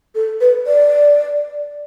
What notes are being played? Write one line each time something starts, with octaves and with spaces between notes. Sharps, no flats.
A4
B4
D5